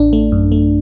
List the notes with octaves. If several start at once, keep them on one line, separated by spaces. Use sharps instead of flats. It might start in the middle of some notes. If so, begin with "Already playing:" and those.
Already playing: A1 D4
A3
F#2
A3